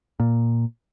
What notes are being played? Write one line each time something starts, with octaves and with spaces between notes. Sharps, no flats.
A#2